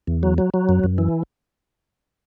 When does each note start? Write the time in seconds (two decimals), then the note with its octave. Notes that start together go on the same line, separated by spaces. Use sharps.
0.07 E2
0.23 F#3
0.38 F#3
0.54 F#3
0.69 F#2
0.84 F#2
0.98 E3